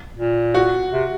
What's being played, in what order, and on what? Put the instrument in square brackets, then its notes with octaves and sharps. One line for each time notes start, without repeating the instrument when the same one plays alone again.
[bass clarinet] A#2
[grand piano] F#4
[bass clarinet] C3